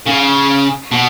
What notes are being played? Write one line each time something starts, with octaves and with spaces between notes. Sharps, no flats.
C#3
B2